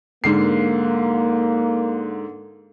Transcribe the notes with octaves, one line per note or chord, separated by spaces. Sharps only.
G#2 D3 A#3 C7